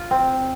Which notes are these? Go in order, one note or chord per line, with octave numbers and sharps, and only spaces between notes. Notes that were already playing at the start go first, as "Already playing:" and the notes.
Already playing: F4
C4